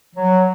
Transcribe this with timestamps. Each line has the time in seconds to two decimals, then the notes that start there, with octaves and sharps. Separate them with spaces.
0.16 F#3